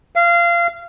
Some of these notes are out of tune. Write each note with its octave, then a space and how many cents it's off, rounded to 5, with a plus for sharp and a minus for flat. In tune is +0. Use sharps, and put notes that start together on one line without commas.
F5 -25